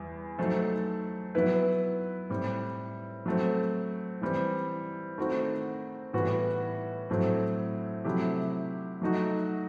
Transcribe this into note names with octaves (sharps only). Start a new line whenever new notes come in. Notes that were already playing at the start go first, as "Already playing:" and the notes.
Already playing: E2 G3
F#3 A3 D#4 A4 C5
F#3 B3 E4 B4
A2 G3 C4
F#3 A3 C4
E3 G3 C4
D#3 A3 C4 F#4
A2 E3 G3 B3 F#4
A2 F#3 A3 C4
C3 F#3 A3 E4 G4
F#3 A3 D#4 F#4